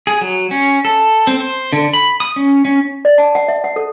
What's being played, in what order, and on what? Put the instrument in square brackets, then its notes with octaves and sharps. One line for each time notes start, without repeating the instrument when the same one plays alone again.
[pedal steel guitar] G#4
F#3
C#4
A4
C4
C5
D3
B5
D#6
C#4
C#4
[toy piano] D5
A5
F#5
E5
F#5
A4